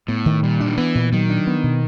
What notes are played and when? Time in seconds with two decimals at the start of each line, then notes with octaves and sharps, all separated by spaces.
0.08 A2 B3
0.26 D#3
0.43 A#2 G3
0.60 D4
0.66 D#3
0.77 E3 B3
0.95 A#2
1.12 D#3 F#3
1.30 D4
1.47 B3
1.63 B2